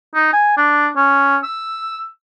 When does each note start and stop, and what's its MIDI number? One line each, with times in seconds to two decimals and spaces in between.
0.14 0.29 63
0.33 0.52 80
0.57 0.87 62
0.96 1.36 61
1.43 2.05 88